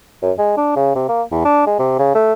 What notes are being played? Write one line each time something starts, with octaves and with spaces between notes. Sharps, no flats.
F#2
G#3
D4
C#3
C3
A#3
E2
D4
G#3
C3
C#3
A3